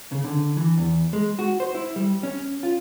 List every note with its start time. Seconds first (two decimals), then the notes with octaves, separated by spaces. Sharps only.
0.12 C#3
0.24 D3
0.57 E3
0.77 E2
1.13 G#3
1.39 F#4
1.60 C5
1.75 E4
1.96 G3
2.23 C#4
2.63 F4